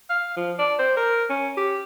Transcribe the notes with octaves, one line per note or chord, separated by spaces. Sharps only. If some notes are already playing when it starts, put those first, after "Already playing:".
F5
F3
D5
C5
A#4
C#4
G4